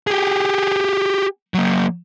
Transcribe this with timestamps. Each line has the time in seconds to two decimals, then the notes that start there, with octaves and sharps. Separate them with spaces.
0.07 G4 G#4
1.54 F#3 A#3